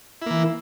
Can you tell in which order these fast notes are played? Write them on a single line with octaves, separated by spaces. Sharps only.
E4 A#3 E3